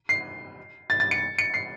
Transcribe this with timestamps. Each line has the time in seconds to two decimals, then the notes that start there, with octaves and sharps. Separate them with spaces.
0.09 C7
0.90 A6
1.00 A6
1.11 C#7
1.38 C#7
1.54 C7